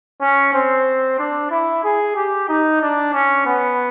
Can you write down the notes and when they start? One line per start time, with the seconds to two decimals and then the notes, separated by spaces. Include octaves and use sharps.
0.21 C#4
0.54 C4
1.19 D4
1.51 E4
1.84 G#4
2.16 G4
2.49 D#4
2.82 D4
3.13 C#4
3.46 B3